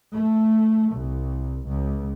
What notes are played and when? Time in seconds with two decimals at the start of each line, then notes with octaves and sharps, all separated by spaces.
0.14 A3
0.93 C2
1.67 C#2